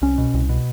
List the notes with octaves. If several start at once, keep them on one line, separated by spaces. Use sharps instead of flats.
C2 C#4
B2
C2
B2